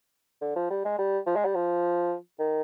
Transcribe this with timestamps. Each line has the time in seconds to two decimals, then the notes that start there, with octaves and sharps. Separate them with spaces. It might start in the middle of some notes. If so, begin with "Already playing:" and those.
0.41 D3
0.56 F3
0.71 G3
0.85 G#3
0.99 G3
1.27 F3
1.36 G#3
1.45 G3
1.55 F3
2.39 D#3